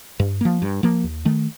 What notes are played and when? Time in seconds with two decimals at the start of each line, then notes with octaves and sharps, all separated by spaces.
0.20 G2
0.41 F3 A#3
0.62 G2
0.83 F3 A#3
1.04 D#2
1.25 D#3 A3